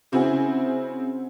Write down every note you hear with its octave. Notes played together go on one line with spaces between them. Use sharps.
C#3 C4 E4 F#4 G#4